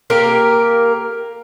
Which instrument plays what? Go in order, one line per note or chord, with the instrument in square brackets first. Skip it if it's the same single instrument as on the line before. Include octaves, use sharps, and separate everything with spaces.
[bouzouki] A#3 G4 A#4